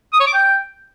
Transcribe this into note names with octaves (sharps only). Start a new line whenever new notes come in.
D#6
C#5
D6
G5